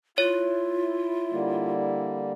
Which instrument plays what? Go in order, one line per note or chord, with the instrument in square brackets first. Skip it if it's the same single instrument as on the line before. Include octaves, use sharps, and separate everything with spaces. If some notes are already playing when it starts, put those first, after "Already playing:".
[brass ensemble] E4 [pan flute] F4 [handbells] C#5
[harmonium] D3 G3 A#3